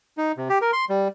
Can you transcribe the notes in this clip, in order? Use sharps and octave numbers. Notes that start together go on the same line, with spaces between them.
D#4
C3
G4
A#4
C6
G3